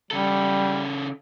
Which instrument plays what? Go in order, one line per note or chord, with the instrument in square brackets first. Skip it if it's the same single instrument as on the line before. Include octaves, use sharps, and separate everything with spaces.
[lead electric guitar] C#3 A4 [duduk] G3